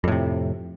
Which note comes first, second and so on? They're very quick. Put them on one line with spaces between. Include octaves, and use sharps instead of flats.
F2 A2 C3